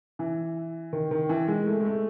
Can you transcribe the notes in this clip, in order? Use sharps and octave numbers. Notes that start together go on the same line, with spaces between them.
E3
D#3
D#3
E3
G#3
A3
G#3
A3